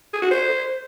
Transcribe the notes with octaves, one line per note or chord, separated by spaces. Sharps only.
G#4
F#4
C5